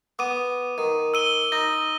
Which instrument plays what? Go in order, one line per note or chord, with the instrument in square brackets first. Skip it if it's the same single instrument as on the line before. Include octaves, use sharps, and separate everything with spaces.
[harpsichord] B3 [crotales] D6 D#7
[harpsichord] D#3
[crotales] E6 D#7 G7
[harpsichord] D#4 [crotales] A#6